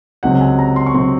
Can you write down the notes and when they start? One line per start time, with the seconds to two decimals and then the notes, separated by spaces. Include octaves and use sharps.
0.23 C#2 C3 F#3 C4 F#5
0.41 G#5
0.59 A#5
0.76 C6
0.86 C#6
0.94 C3 F#3 C4 C6